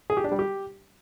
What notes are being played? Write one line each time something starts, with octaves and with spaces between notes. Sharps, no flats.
G#4
G4
D4
G3
G4